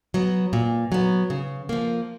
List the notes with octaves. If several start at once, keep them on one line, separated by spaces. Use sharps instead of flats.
F#3 B3
A#2
F#3 B3
C#3
F3 A#3